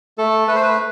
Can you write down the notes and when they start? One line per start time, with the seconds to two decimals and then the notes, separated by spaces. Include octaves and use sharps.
0.18 A3 A4
0.48 A3 B4
0.55 C5
0.63 B4